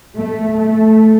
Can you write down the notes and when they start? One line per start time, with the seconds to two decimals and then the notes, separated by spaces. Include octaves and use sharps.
0.16 A3
0.57 A3